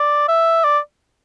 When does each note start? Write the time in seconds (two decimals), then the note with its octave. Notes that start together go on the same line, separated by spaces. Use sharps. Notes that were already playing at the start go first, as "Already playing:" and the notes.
Already playing: D5
0.28 E5
0.64 D5